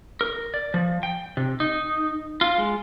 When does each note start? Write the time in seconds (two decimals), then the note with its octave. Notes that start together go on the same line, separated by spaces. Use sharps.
0.21 A#4
0.54 D5
0.74 F3
1.03 G5
1.37 C3
1.60 D#4
2.41 F4
2.58 G#3